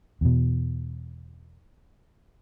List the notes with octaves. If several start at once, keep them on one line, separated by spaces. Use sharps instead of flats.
E2 B2